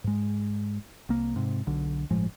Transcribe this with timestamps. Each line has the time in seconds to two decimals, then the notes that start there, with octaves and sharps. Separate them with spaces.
0.04 G#2 G#3
1.09 C2 A#3
1.36 G#2 C3
1.67 B1 D3
2.11 G1 A2 F3 G#3